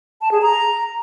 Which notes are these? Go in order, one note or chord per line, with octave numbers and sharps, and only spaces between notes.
A5
G#4
A#5